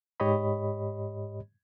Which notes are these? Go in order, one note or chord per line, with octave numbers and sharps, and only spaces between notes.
G#2 G4 C#5 D#5 B5